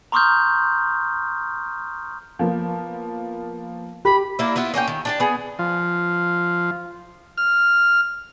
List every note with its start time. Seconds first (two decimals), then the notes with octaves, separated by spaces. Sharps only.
0.12 A#5 C6 C#6 D#6 F6 G6
2.39 F3 A#3 B3
4.05 G4 B5
4.39 A#3 D4 E4
4.56 B3 E4 F4 B4
4.74 A#3 C#4 F#4 G5
4.88 D#3
5.05 D4 G4 A5
5.20 B3 G#4
5.59 F3
7.37 F6